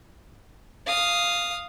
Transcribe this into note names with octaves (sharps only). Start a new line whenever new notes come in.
F5 D#6